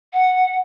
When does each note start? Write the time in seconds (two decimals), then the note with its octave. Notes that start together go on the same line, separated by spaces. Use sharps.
0.13 F#5